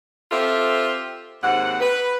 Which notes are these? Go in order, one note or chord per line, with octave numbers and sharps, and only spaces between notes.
C4 F4 G4 A4 C5 E5
D#2 G#2 C4 F#5
B4